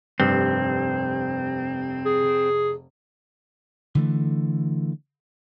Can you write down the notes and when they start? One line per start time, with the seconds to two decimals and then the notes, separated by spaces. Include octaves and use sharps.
0.20 F1 G2 C4
2.05 G#4
3.95 D3 E3 A3